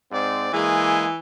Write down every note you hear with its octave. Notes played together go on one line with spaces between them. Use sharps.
G#2 C4 D5
E3 G#3 A#3 G#4